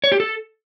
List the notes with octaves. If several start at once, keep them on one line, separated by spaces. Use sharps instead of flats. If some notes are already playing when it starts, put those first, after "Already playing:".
C#5
G4
A4